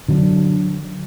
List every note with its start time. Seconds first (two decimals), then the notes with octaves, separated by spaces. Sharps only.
0.08 D3 F#3 A#3 D4